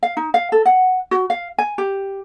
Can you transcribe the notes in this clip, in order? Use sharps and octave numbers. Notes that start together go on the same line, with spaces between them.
F5
D#4
F5
A4
F#5
F#4
F5
G#5
G4